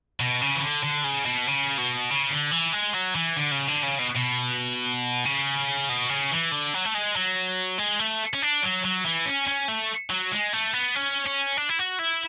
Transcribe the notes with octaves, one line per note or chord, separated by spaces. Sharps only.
B2
C#3
E3
D3
D3
C#3
B2
C#3
B2
C#3
D3
E3
G#3
F#3
E3
D3
C#3
D3
C#3
B2
B2
C#3
B2
C#3
E3
D3
F#3
A3
G#3
F#3
G#3
A3
C#4
D4
F#3
F#3
E3
C#4
C#4
A3
F#3
G#3
A3
B3
C#4
C#4
D4
E4
F#4
E4